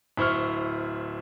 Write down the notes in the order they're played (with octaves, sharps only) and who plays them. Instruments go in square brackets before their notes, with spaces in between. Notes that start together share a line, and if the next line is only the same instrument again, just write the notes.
[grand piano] D1 E4 C5 C#6 F6